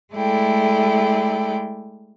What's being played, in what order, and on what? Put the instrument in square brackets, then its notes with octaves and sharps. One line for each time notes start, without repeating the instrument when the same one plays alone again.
[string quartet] G#3 A3 E4 A4 D5 G5